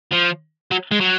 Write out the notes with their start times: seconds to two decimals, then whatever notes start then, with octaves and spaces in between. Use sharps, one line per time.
0.13 F3
0.71 F#3
0.91 G#3
1.01 F#3